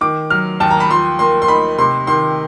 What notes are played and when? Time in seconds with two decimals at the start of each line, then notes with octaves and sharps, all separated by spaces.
0.01 D#3 D6
0.30 F#3 F6
0.60 D#2 A5
0.71 A#5
0.80 B5
0.90 F3 C6
1.19 A#3 C6
1.42 C6
1.48 D#4 B5
1.78 C3 C6
2.07 D#3 C6